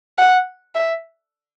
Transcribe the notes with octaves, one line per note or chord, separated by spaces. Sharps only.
F#5
E5